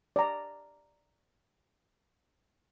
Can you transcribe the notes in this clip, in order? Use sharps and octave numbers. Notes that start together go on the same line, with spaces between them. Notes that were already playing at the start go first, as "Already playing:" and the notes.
D5 A#5